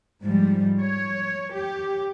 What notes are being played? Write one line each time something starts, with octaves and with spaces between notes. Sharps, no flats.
G#2 F3 G3
C#5
G4